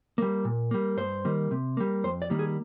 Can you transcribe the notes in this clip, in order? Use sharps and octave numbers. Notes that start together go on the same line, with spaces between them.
G3 A#3
A#2
G3 A#3
G2 C5
D#3 G3 A#3
C3
G3 A#3
F2 C5
D5
D#3 G3 A#3
G#4